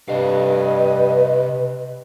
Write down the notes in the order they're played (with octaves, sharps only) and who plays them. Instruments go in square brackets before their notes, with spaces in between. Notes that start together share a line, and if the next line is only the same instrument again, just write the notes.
[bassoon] G2 [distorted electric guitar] C3 F5 [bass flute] B4 [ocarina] D#5